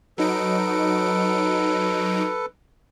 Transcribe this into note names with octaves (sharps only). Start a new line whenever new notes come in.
F#3 D#4 A4 B4 D7